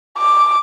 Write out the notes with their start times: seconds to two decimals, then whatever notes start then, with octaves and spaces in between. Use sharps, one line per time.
0.18 D6